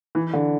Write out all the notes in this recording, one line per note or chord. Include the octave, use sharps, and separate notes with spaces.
E3
D3